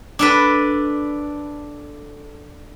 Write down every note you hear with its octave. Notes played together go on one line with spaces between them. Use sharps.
D4 A4 B4